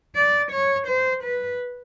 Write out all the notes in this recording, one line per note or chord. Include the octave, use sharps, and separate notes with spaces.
D5
C#5
C5
B4